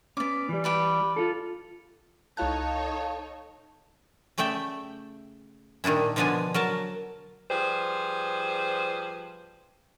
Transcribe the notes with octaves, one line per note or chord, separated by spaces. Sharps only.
B3 C#4 D5 D6
E3 G3
G4 B4 D5
F4 A4
C2 D#4 E4 A4 C#5 F5 A5 F#6
C#3 A3 D5 E5 G5
A#2 D#3 G3 D4 E4
B2 D3 F3 B3 D4 G#5
F#3 A#4 A5
F3 G3 G#4 B4 C5